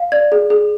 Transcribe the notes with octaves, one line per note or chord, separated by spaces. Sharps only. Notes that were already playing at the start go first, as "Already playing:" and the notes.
Already playing: F5
D5 G#6
G#4
G#4